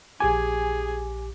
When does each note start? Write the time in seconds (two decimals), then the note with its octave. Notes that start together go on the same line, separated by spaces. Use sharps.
0.20 A#1 G4 G#4 G#5 D6